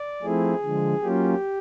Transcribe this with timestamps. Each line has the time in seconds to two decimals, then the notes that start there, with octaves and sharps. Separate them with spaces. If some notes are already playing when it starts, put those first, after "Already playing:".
Already playing: D5
0.22 F3 A3 C4 E4 G#4
0.62 D3 F3 G#3
1.02 F#3 A#3 C#4 F4 G4